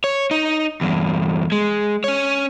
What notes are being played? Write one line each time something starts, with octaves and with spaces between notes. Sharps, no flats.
C#5
D#4
E2 G2
G#3
C#4 C#5